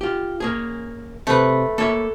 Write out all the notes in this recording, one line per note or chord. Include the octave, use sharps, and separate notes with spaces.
F4 G4
A#3 C#4 G#4
C3 A3 B4
A#3 A4 C#5 E5